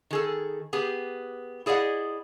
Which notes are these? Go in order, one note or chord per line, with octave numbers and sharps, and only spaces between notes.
D#3 G#4 A4
B3 G4 G#4
E4 G#4 D5 D#5 F#5